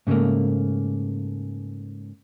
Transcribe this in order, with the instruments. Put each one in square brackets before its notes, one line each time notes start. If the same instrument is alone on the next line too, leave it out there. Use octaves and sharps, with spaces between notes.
[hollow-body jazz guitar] G#2 C#3 F#3 A3 A#3